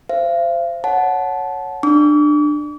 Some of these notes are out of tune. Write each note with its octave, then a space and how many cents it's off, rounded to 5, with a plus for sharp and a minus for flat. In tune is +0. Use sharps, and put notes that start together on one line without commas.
C5 +0 F5 -45
C#5 +0 F#5 +0 A5 -20
D4 +25 D6 -45